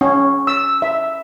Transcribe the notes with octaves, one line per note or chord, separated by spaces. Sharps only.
C#4
E6
E5